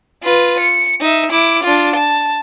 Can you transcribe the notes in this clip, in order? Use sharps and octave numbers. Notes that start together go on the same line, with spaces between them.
F4 B4
C#7
D#4 E5
E4 D6
D4 F4
A5